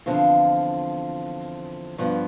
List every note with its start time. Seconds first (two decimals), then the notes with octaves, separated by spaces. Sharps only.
0.06 E2 D3 F3 C4 F4
1.98 G2 F3 B3